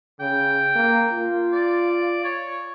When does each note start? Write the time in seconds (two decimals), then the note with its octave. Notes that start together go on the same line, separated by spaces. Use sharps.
0.20 C#3 G5
0.76 A#3
1.12 F4
1.53 D5
2.25 C#5